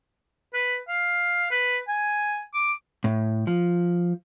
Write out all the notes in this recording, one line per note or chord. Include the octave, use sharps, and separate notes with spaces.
B4
F5
B4
G#5
D6
A2
F3